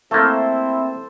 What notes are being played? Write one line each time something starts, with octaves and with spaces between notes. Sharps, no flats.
A3 A#3 C4 E4 A4 C5